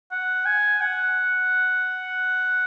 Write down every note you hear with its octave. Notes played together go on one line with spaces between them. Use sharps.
F#5
G#5
F#5